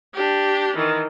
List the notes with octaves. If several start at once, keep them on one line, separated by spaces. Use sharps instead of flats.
D4 G4
D#3 E3